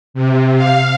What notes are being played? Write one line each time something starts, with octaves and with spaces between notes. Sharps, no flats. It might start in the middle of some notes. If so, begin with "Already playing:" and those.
C3
F5